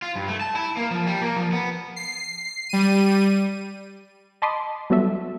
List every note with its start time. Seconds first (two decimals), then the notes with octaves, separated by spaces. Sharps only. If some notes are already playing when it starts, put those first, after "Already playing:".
0.02 F4
0.16 G2
0.28 A3
0.41 A5
0.56 E4
0.77 A#3
0.91 F3
1.06 G3
1.22 A#3
1.36 F3
1.52 B3
1.96 C7
2.69 G3 D#7
4.42 D#5 A5 B5 C6 D6 D#6
4.90 F#3 G3 B3 F#4 A4 E5